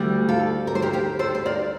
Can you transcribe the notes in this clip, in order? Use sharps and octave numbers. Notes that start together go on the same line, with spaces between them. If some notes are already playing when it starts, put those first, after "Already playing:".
Already playing: D2 D3 G3
F4 A4
A#4
C5
G4 A#4
G4 A#4
A4 C5
C5
A#4 D5